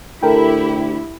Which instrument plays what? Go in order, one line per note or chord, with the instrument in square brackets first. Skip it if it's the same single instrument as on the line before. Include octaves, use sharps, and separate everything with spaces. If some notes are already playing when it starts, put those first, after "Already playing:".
[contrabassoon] D2 [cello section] E4 G4 [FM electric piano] A4 A#4 G5